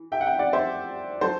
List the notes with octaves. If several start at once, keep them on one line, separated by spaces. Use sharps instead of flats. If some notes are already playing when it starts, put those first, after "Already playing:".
Already playing: E3
E5 G5
F#5
E5 G5
D5 F#5
C5 E5
F#3 A4 C5